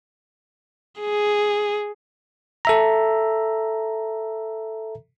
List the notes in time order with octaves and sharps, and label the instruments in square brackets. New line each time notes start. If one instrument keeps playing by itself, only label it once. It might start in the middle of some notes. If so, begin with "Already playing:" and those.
[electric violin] G#4
[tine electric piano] A4 E5 A#5